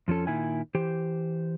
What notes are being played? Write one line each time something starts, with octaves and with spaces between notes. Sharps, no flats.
F2 F3 C#4 A4
A#2 D#3 E4 G#5
E3 G4 C5